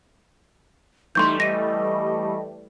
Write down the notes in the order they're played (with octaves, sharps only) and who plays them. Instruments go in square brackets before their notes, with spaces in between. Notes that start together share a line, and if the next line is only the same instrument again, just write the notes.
[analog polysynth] E3 G3 A3 [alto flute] D#4 [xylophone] C6 C#6 G6
[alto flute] D#5 [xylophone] A#6 D#7